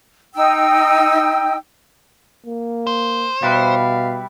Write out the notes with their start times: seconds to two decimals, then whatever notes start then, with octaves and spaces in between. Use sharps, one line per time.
0.35 D#4 G5 E6
2.46 A#3
2.87 C5
3.43 B2 G3 E4 B4 F5